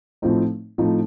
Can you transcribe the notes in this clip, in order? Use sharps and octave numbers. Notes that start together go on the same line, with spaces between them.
A2 F3 A3 C4 D#4
A2 F3 A3 C4 D#4